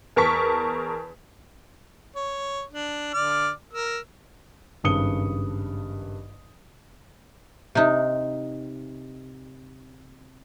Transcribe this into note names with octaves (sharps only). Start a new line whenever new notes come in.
E2 A#4 A5 C#6 B6
C#5
D4
D3 D5 F6
A#4 E6
G#1 G2 C#3 D#6 C#7 G7
C3 D#4